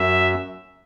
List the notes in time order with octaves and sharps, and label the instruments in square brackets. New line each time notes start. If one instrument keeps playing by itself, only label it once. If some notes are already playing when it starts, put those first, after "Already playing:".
Already playing: [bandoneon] F#2 [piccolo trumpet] E5